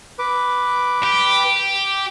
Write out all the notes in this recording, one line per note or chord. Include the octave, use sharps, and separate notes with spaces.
B4 D6
G4